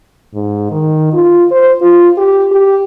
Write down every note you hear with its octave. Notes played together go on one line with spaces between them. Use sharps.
G#2
D#3
F4
C5
F4
G4
G4